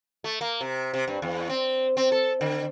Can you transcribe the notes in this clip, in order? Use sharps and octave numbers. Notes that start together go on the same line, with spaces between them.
A3
A#3
C3
C3
G2
E2
C4
C4
A4
D3